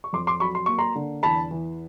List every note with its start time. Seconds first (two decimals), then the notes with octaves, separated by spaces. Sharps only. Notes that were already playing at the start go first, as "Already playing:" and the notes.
0.04 C#6
0.13 F2 C6 D6
0.27 C6 D6
0.40 F#3 B5 C#6
0.55 C6
0.66 A#3 C#6
0.79 A#5 C6
0.95 D3
1.23 E2 A5 B5
1.51 E3